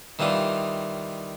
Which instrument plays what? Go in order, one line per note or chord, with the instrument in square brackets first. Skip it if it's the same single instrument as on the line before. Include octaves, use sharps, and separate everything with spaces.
[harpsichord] D#3 E3 G3 F4 D#6